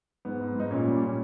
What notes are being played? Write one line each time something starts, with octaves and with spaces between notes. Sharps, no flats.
G#2 B3
G#2
G#2 D#4
A#2 C#4
G3
A#2 C#4